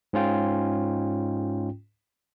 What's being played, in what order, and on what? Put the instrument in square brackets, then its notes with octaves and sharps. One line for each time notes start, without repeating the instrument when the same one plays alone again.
[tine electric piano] G#2 C#4 F4 G5